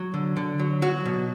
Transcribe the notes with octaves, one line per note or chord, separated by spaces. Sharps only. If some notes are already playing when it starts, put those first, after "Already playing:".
Already playing: F#3
D3
D3
F#3
F#3 F#4
B2